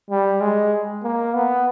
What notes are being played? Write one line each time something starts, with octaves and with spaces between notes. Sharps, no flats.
G3
G#3
A#3
B3